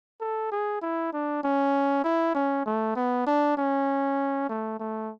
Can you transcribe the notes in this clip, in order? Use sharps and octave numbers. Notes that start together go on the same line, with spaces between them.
A4
G#4
E4
D4
C#4
E4
C#4
A3
B3
D4
C#4
A3
A3